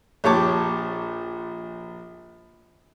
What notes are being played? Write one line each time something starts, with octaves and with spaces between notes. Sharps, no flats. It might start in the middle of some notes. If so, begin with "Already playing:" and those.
A#1 G4 C#5 A5 D6